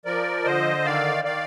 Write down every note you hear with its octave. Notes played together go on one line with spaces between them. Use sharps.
F3 A#4 D5
D3 C5 D#5
D#3 D5 F5
D#3 D5 F5